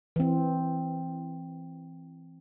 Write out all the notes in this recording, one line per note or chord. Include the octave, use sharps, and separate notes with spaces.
E3 C4